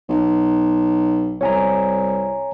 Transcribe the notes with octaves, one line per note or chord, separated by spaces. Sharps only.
B1
C2 C#5 G#5 A#5